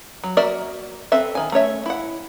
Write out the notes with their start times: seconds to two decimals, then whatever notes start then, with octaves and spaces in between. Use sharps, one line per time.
0.24 F#3
0.37 A#3 F#4 A#4 D5 E5
1.12 C4 A4 B4 E5
1.35 D#3 G#5
1.52 A3 C#4 C#5 E5
1.86 E4 F#5